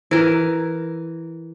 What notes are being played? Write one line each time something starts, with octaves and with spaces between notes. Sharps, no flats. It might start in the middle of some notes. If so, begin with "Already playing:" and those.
E3 A#4